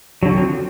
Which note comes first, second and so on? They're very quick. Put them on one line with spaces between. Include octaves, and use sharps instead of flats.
F#3 D3 F3 C4